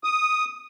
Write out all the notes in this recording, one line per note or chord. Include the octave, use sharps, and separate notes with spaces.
D#6